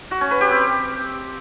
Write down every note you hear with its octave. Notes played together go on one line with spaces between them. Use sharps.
F#4
C#4
B4
G4
C4